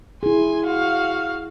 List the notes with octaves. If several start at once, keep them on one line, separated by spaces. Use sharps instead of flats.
E4 G#4 G#5 C6
F#4 F5